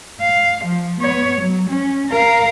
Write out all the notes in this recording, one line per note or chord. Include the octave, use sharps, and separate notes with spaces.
F5
F3
B3 C#5
F#3
C#4
A#4 F5